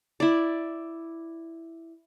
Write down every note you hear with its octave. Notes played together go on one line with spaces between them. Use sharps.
E4 D5